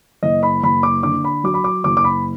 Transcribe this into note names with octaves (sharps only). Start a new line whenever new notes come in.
F#1 D#5
B5
F#1 B5
D6
D3 D6
B5
F#3 D6
B5
D6
F#1 D6
D6
B5